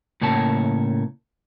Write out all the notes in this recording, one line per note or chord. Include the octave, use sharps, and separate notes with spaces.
A2 C#3 A#3 C#5 A5